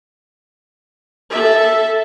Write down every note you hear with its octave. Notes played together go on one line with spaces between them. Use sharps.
A4 E5